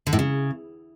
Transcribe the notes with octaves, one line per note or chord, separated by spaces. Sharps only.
D3
A2
C#3